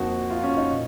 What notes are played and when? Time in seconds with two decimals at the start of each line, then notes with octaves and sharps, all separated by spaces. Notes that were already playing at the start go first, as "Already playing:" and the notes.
Already playing: F2 F3 A#3 D#4 F#4
0.30 F4
0.44 C#4
0.57 D#4
0.72 A#2